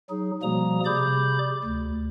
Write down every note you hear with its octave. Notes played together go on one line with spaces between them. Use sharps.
F#3 D#4 G#4
B2 F3 G3 A#3 A#5 D#6
C3 G#4 D5 B5 D6 G6
D2